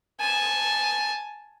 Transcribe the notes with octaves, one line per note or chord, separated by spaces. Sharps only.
G#5 A5